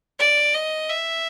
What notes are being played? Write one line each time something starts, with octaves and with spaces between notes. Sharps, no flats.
D5
D#5
E5